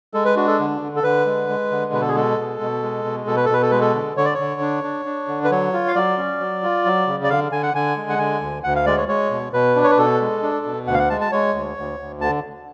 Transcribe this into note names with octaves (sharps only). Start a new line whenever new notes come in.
G#3 A4
B4
D4 F#4
A4
D3
D3
A4
D3 B4
G#3
G#3
D3
B2 B4
A4
G#4
G#3 A4
B2
B2
G#3
B2
B2 A4
B4
A4
B2 B4
A4
G#3 B4
A4
D3
D3 C#5
D5
D3 C#5
D4
D4
D4
D3
B4
F#3 C#5
F4
F5
F#3 D5
C#4
F#3
F4
F#3
C#3
D5
D3 F5
D3 G#5
F#5
D3 G#5
G#3
F#5
D3 G#5
D2
D2 F#5
F5
G#3 D5
C#5
G#3 C#5
B2
B2 B4
D4
C#5
B4
B2 A4
G#3
D4
B2
D2 F#5
F5
F#5
G#3 A5
A5
G#3 C#5
D2
D2
D2
D3 A5